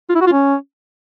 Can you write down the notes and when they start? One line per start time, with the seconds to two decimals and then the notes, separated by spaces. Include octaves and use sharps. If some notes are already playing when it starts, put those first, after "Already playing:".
0.09 F4
0.15 E4
0.21 F#4
0.27 F4
0.33 C#4